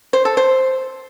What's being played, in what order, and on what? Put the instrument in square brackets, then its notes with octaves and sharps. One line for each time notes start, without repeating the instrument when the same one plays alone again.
[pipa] C5
A4
C5